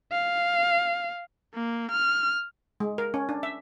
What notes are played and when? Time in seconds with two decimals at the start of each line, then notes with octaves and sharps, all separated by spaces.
0.12 F5
1.54 A#3
1.92 F6
2.80 G#3
2.98 A#4
3.14 C#4
3.29 D4
3.43 E5